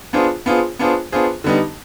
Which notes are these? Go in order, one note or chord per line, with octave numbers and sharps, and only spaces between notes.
B3 D4 F4 G#4 C5
B3 D4 F4 G#4 C5
B3 D4 F4 G#4 C5
B3 D4 F4 G#4 C5
D3 G3 B3 D#4